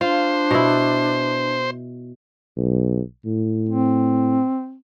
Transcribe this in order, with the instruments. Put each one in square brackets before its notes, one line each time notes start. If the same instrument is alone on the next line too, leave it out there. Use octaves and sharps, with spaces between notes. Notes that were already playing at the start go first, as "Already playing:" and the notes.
[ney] D4 [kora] F4 [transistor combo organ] C5
[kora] B2 E4
[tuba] B1
A2
[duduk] C4